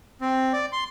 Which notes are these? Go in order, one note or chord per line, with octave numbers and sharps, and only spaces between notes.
C4
D5
C6